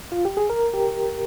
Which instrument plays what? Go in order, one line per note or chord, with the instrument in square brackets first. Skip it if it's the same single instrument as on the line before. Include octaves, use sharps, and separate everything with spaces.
[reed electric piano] F4
G4
G#4
A#4
G4